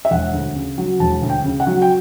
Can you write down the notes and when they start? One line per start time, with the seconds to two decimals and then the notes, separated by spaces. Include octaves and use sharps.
0.05 E5
0.11 E1 F#5
0.33 D2
0.56 C#3
0.78 F#3
1.00 E1 A5
1.22 D2
1.30 G5
1.44 C#3
1.60 F#5
1.67 F#3
1.82 G5